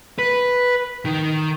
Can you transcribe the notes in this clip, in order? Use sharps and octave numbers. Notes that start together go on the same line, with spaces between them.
B4
D#3